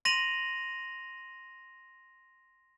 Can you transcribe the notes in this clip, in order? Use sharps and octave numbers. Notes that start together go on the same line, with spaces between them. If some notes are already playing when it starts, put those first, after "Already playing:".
C6 A#6 D#7 F7 F#7